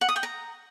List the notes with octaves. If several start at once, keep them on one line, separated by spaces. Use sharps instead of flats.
F#5
D#6
G5
A#5